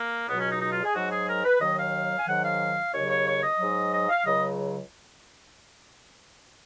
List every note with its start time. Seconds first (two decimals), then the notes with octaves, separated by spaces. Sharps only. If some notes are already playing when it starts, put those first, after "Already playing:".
Already playing: A#3
0.27 C#2 B2 F#3 B3
0.39 C#4
0.50 D#4
0.61 D#4
0.72 F4
0.84 G#4
0.94 G#2 F#3 F#4
1.10 G#4
1.27 A#4
1.44 B4
1.60 D#2 D#3 F#3 D#5
1.77 F5
2.19 G#5
2.27 G#2 D#3 F#3 F#5
2.43 F5
2.93 D#2 C#3 F#3 C#5
3.10 C#5
3.27 C#5
3.43 D#5
3.59 G#2 F#3
3.93 D#5
4.09 F5
4.25 C#2 C#3 F#3 D#5